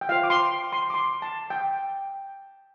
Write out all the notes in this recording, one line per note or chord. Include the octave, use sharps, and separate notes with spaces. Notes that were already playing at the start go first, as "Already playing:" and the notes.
G5
F4 C5 F5
D6
C6
C6
D6
C6
A5
G5